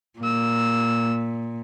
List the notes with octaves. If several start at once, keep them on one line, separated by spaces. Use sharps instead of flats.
A#2 A#3 E6